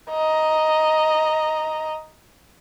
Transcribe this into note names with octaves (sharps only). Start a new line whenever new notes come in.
D#5 A#5